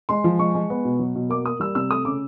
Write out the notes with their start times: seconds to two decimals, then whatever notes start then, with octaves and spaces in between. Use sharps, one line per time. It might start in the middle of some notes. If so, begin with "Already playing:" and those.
0.09 G#3 C6
0.24 F3
0.39 G#3 C#6
0.54 G#3
0.70 B3
0.85 B2
0.99 F#3
1.15 B2
1.29 A#3 D6
1.45 A#3 D#6
1.60 G3 E6
1.75 C3 E6
1.90 A3 D#6
2.05 C#3 D6